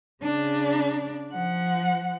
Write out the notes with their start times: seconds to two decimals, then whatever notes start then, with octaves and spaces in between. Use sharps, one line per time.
0.23 C#3 D4
1.32 F3 F#5